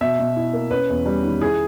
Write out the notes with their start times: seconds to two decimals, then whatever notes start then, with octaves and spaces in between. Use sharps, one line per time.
0.01 B2 E5
0.19 B2
0.36 E4
0.54 A#3
0.71 C#4 B4
0.89 E2
1.06 G3
1.24 D#3
1.41 E4 G#4